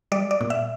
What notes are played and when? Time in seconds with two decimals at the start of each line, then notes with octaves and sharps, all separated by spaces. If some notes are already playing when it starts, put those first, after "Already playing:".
0.12 G3 D5
0.31 D5
0.41 A#2
0.50 E5